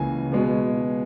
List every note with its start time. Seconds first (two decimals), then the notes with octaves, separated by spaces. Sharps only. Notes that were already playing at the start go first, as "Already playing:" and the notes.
Already playing: C#2 C#3 E3 A#3 G#5
0.32 B2 G#3 B3